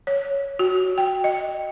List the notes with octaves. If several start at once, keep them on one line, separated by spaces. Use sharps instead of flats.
C#5
F#4
G5
D#5